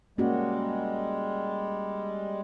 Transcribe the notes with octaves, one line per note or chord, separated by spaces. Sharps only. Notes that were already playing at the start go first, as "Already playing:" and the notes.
G3 G#3 A#3 C#4 F#4